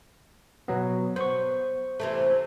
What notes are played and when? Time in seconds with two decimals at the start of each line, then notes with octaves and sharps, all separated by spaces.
0.68 B2 F#3 B3
1.16 B3 C5 C#6
2.00 C3 E3 A3